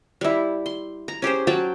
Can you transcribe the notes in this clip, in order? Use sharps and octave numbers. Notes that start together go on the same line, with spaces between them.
G3 E4
C6
A#5
C#4 G4 G#4 C5
F#3 F#4 G5 A5